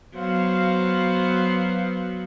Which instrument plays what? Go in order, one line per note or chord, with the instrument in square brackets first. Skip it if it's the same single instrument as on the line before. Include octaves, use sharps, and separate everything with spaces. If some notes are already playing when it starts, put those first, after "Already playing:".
[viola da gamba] F#3 B3 [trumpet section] C5 F5